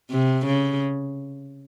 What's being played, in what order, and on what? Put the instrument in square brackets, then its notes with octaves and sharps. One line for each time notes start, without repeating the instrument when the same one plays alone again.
[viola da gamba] C3
C#3